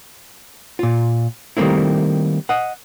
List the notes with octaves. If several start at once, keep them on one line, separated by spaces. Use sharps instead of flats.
A#2 F4
D#3 G3 A3 A#3 C4 E4
D#5 F#5